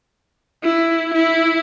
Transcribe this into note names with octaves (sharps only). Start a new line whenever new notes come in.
E4
E4